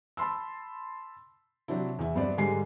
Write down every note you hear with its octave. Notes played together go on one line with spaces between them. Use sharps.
A5 B5 C6 E6
C3 F#3 C4 D4 E4
E2 E5
G2 B3 C5 D5
G#2 D3 G3 G#5 C7